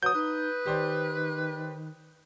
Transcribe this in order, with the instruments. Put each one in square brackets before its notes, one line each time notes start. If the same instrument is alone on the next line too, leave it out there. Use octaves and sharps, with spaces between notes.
[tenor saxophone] F#3 [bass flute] B4 [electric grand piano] D#6 G6
[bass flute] D#4 [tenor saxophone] B4
[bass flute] D#3 [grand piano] G4 C5 D5